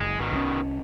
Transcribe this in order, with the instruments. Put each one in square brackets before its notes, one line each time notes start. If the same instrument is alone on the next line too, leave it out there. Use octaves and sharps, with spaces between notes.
[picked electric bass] F#1 [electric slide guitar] G#3
[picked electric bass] G#1 [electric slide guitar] B2 D#3
[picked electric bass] C2 E3 C#4